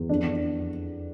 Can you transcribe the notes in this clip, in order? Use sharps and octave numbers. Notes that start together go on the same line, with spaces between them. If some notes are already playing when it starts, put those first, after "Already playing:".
Already playing: E2
F2 D4
F2